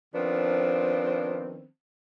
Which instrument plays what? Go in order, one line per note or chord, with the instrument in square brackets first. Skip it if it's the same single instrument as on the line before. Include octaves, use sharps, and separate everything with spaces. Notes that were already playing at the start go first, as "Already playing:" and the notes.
[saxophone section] D#3 F3 B3 C4 D4